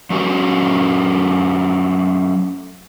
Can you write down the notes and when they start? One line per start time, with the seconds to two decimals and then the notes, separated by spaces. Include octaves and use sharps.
0.10 F#3 A3 C#4 D#4 F#4 G4